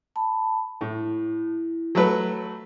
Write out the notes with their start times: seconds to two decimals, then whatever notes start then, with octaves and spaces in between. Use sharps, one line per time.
0.16 A5 B5
0.81 A2 E4
1.95 F#3 A3 B4